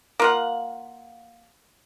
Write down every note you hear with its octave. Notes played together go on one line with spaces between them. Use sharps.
A#3 F4 F#5